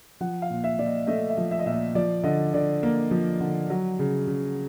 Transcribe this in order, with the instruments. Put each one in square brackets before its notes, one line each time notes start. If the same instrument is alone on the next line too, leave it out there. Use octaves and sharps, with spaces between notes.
[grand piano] F3 F#5
F5
A#2
E5
A#2 D5
D#5
A3 D#5
E5
F3
E5
D#5
A#2 E5
D#5
F3 D5
D3 D#5
D3 D5
A#3
F3
D3
F#3
C#3
C#3